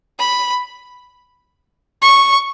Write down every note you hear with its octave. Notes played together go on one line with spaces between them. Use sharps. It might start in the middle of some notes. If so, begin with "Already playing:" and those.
B5
C#6